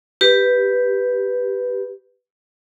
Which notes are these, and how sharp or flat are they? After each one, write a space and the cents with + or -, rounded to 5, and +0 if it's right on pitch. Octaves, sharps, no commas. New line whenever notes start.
G4 +0 B4 +0